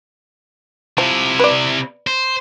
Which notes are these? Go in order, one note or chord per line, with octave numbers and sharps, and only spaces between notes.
C3 F3 E4
B4 D5
C5